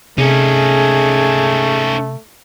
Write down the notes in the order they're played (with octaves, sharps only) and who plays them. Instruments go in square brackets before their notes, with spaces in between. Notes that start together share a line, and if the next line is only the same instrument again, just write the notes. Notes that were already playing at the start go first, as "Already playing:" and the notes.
[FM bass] C3 [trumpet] A3 [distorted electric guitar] C#4 D#4 [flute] G#4